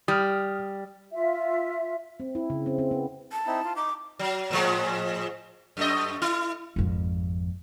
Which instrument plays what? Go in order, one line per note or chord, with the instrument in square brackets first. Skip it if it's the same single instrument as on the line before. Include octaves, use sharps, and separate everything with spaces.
[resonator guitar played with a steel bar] G3 [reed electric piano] D#6 F6
[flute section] F4 E5
[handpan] C4
E4
C#3
C4
C4
B3
[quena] A5
[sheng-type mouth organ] C4 D#4 E4
F4
[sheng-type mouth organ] D#4 [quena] D6
[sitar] F#3
A2 F3 G#3
F#2 A3 D#5
E4
[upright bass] G#1 F2